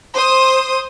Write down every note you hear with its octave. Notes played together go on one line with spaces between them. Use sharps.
C5 D#6